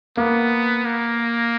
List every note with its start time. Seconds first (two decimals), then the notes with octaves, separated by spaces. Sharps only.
0.17 A#3 B3
0.85 A#3